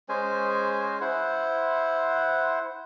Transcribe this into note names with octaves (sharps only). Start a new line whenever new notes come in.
G#3 C#4 C5 G#5
E4 C5 F#5